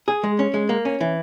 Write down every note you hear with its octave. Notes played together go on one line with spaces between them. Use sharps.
G#4
G#3
C#4
G#3
A#3
C#4
E3